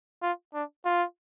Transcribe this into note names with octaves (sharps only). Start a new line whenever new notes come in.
F4
D4
F4